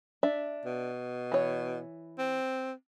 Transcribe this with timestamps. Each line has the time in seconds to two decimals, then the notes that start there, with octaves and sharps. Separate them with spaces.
0.23 D4 E5
0.66 B2
1.32 E3 C#5
2.18 C4